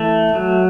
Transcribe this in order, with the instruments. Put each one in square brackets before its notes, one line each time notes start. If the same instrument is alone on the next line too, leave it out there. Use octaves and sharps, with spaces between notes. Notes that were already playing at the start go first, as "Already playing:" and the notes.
Already playing: [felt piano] E3 [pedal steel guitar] A3
[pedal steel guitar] F#3